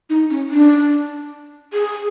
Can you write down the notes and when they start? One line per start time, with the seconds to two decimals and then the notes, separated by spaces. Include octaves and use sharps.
0.10 D#4
0.30 C#4
0.50 D4
1.73 G#4